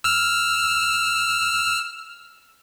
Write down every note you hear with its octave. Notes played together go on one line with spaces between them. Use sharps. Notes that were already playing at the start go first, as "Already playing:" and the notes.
E6 F6